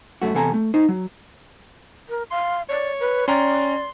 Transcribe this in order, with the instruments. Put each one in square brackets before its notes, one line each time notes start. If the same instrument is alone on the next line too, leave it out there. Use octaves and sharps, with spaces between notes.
[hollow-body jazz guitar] F#2 A3 F#4
E2 C3 A4 G#5 A#5
A3
D#4 C5
F#3
[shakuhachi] A#4
[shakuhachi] F5 [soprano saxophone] C6
[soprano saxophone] C#5 [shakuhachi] D5
[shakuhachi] B4
[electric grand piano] C#4 G5 A#5 [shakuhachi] D5 [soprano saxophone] C6